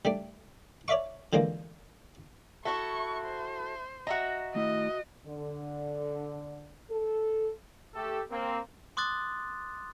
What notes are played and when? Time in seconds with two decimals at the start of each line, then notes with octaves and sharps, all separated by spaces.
0.05 G3 A3 D4
0.88 C#5 D5 E5 F5 C#6
1.33 D3 E3 F3 G#3 A#3
2.65 E4 F#4 A4 E5 C#6
3.26 C5
4.07 F#4 D#5 E5 A#5
4.55 D#3 A3 E4 D#5
5.26 D3
6.91 A4
7.95 A3 G4 A4
8.31 A#3 C4
8.97 C6 D6 D#6 F#6 A6